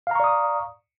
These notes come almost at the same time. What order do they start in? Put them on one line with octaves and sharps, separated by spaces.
F5 A#5 C#6 D5 D#6